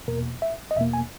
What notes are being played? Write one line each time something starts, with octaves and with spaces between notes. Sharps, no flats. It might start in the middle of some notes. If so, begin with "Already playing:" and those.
E2 B2 A#3 A#4
E5
D#5
E2 B2 A#3 E5
G#5